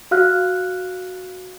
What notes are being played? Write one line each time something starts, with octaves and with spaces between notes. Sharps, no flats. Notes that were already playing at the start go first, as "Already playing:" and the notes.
F#4 F5 F6 F#6